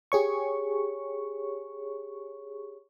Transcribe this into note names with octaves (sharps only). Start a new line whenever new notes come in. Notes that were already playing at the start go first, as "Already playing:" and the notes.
G4 G#4 C#5 C#6